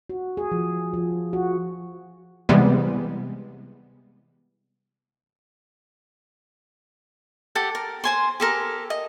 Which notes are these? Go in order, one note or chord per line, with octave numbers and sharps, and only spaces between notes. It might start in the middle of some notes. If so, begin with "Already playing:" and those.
F#4
G#4
F3
F3
F#4
C3 E3 G3 G#3 B3
G4 A4 F#5
A#4
C5 G#5 C6
G4 A4 A#4
D#5